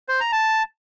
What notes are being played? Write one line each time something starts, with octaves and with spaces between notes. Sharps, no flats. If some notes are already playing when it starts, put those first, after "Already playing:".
C5
A#5
A5